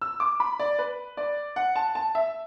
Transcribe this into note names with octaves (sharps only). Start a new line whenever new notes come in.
E6
D6
B5
D5
B4
D5
F#5
A5
A5
E5